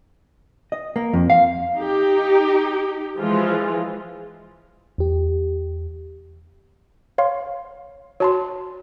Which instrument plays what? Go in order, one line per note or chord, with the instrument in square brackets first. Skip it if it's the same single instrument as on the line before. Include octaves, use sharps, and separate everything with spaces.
[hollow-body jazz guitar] D#5
A#3
F2
F5
[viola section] D#4 G4
E3 F3 G#3 F4
[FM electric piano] E2 G4
[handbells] C#5 F5 C6
[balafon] F#4 [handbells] C#5 A5 C6